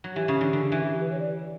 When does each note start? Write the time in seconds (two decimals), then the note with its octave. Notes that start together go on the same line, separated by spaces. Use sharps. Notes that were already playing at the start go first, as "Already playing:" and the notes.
0.04 F#3
0.15 E3 G4
0.28 C#3
0.41 D3
0.53 D3
0.72 E3
0.91 G4
1.01 B4
1.10 C#5
1.19 D5